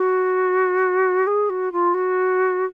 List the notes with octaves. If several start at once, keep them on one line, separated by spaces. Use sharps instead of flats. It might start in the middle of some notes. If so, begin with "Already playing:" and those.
Already playing: F#4
G#4
F#4
F4
F#4